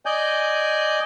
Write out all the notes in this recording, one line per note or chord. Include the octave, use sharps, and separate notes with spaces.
D5 D#5 G#5 G6